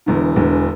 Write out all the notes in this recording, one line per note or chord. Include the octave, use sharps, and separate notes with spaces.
E1 E2 D3
E1 E2 D3